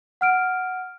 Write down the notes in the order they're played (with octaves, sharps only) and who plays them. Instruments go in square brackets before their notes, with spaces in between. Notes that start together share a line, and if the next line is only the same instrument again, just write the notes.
[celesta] F#5 F6 D7